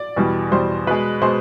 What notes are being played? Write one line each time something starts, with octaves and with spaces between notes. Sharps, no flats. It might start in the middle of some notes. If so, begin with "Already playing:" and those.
Already playing: D5
E2 B2 G3
E2 B2 G3 C5
B2 G#3 B4
B2 G#3 C5